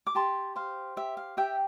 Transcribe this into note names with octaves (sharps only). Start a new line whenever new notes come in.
D6
G4 A5 C6
C5 F5
G4 E5
F5
G4 E5 G5